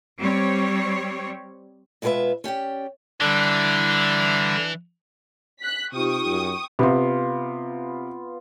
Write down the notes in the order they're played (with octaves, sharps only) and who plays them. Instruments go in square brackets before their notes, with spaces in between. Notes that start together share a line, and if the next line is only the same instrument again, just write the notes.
[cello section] G3 C4 C#5
[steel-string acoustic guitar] B2 G#3 F4 G#4 B4 E5
C#4 G4 D5 G5
[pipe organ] D3 G3 [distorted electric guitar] E3 [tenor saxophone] D4
[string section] F#6 B6
[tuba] C3 [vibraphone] D#4 F4 G4 [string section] G5 C#6 D#6
[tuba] F#2
[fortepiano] C3 [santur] B3 F4